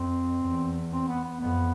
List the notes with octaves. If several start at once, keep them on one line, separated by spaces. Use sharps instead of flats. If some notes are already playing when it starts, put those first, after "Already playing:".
Already playing: F2 C4
E2
C4
B3
B3
F2 B3